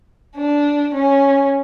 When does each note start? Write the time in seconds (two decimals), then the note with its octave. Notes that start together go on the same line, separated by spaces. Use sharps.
0.37 D4
0.94 C#4